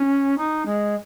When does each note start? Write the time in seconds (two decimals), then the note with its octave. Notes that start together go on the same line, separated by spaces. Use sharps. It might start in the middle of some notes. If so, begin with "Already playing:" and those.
Already playing: C#4
0.38 D#4
0.66 G#3